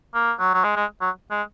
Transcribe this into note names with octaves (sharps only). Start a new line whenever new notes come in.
A#3
F#3
F#3
G#3
G#3
F#3
G#3